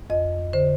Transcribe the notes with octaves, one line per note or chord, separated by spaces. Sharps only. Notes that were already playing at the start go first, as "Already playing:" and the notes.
F2 D#5
D3 C5